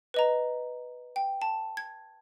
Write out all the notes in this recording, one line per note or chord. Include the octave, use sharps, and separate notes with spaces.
B4 D#5 A#5
G5
A5
G#6